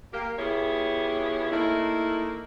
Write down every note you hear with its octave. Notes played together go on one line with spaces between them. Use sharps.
A#3 G4
B3 E4 F4 G4 G#4 C#5
A3 A#3 D#4 E4